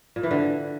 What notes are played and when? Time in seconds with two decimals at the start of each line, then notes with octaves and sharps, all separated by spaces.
0.16 A#2
0.23 E3
0.31 D3